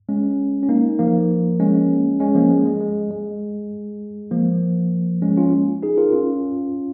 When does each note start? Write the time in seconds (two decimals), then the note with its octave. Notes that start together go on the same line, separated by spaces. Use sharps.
0.09 G#3 C#4
0.63 C#4
0.69 A#3 D#4
0.99 F3 A#3
1.60 G#3 C#4
2.20 G#3 C#4
2.35 F3 A#3
2.50 G#3
2.66 G#3
2.81 G#3
3.11 G#3
4.31 F3 A#3
5.22 G#3 C#4
5.37 C#4 F4
5.83 D#4 G#4
5.97 F4 A#4
6.13 C#4 F4